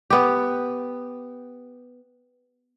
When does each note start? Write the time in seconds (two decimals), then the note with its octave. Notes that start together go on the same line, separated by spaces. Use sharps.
0.10 B3 G4